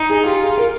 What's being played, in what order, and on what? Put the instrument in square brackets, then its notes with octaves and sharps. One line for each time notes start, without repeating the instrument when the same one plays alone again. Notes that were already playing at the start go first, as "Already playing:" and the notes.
Already playing: [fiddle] D#4
[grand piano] G#4
[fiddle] F4 [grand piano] G4
[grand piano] G#4
A#4